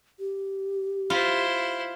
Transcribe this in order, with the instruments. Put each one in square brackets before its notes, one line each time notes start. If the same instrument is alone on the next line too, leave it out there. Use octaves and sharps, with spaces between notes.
[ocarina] G4
[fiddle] E4 C5 [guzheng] F4